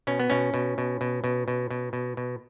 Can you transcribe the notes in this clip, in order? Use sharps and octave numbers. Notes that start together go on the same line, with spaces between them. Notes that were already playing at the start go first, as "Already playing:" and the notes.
B2 C#4
B3
B2 C#4
B2
B2
B2
B2
B2
B2
B2
B2